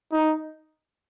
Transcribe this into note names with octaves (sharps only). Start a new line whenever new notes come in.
D#4